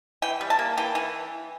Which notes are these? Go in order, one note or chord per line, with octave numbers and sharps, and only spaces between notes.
E3 G5
G3
A5
A#3
E3 G5
E3